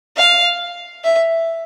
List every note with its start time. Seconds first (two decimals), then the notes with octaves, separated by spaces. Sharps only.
0.17 F5
1.04 E5